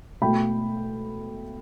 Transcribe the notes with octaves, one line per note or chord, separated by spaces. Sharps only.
B2 A3 G5 B5